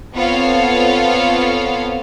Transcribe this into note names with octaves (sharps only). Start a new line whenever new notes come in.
B3 C4 F4 A4 C#5 F5